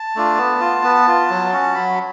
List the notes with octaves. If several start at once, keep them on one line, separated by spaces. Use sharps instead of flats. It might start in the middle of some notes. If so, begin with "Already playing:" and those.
Already playing: A5
A3 D4 F4
B3
F4
B3
F4
F#3
C#4 F#4
F#3 B5